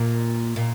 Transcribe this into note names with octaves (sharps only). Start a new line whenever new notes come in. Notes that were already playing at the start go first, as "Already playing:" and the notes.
Already playing: A#2
A#2